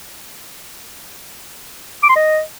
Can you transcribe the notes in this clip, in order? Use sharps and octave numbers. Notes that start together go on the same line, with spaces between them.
D6
C6
D#5